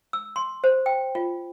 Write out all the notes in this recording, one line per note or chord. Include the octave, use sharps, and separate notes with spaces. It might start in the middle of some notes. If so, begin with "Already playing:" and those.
E6
C6
C5
G5
F4